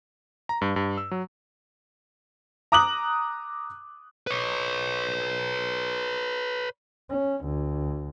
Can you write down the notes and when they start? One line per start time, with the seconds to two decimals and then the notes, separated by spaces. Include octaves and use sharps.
0.49 A#5
0.62 G2
0.76 G2
0.97 E6
1.11 F#3
2.72 A#5 D6 D#6 F#6 F#7
4.27 B4 C#5
7.09 C#4
7.45 D2